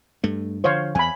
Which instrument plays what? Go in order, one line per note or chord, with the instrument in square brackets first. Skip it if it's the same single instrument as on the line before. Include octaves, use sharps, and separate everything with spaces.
[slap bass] G2 A3
[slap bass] D3 F3 [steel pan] C5 C#5 F5
[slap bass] E2 [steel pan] G#5 B5